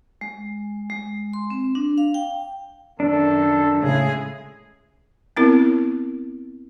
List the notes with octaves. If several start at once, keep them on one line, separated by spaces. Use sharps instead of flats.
G#3
G#3
C6
C4
D4
F5
G5
F#2 D#3 D4 A4
A2 C#3 G#3 E4 G#4
B3 C4 E4 A#4